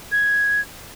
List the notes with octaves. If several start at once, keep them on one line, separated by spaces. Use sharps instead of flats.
G#6